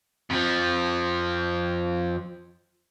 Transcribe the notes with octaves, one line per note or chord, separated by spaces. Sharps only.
F2 F3